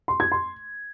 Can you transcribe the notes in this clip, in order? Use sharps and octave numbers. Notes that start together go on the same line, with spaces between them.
C6
G#6
C6